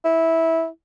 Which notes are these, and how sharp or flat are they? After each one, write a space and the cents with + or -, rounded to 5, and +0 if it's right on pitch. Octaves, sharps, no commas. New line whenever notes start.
E4 -15